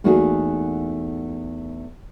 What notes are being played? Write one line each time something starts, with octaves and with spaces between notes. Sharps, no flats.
E2 A3 A#3 D#4 F#4 G#4